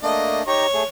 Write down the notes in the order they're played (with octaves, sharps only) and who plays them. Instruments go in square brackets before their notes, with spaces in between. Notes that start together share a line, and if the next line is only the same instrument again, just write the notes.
[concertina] A3 A#3 D4 [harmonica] D#5
[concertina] D#4 G4 A#5 [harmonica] C#5
[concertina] A3 G#4